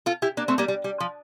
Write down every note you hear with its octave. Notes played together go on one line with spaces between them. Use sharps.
F4 A4
E4 G4
A#3 D4
A3 C4
G3 A#3
G3
G3
F3